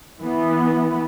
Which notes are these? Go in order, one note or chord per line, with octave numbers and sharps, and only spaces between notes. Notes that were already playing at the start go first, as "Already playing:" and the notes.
E3 B3